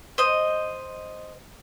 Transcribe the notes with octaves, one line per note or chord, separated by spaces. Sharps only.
C5 D#5